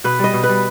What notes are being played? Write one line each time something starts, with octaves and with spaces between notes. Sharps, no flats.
B2 B4
G3 D#5
B2
B4
G3